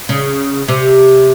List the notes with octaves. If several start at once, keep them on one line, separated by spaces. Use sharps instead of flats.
C#3
C3